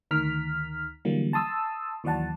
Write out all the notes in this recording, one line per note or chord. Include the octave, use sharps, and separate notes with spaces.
D2 D#3 A#5 F6 B6
D3 E3 F#3 G3 A#3
A5 C6 D#6 E6
D#2 E3 F#3 D5 F#5 A5